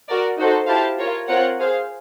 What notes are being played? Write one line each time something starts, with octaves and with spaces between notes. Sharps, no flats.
F#4 A#4 D5
D#4 F#4 A4 C5
E4 G4 C5 F5 A5
F4 A#4 C#5
C4 F4 A#4 C#5 F#5
G#4 C5 F5